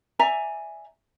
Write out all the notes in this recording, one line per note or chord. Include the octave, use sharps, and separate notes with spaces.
D5 E5 G#5 A#5